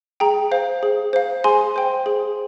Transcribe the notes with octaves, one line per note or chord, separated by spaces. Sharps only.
G#4 G5 A#5
C5 F5
G#4
C5 F5
G#4 G#5 C6
C5 G5
G#4